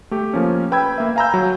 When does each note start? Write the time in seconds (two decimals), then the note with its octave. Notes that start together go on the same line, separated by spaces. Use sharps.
0.11 A3 G4
0.33 F3 A#3 C#4
0.72 B4 G5 B5 E6 G#6
0.98 A#3 E5
1.16 F5 G#5 A#5 B5 E6 G6
1.34 F#3